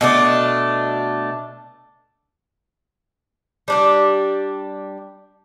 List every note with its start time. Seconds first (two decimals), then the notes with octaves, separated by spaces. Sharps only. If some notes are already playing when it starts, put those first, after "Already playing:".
0.01 B2 A3 D4
3.68 G3 D4 G4